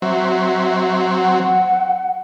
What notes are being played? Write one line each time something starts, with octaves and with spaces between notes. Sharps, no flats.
F#3 C4 E5
F#5